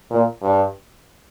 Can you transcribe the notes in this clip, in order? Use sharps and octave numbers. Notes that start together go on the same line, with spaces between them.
A#2
G2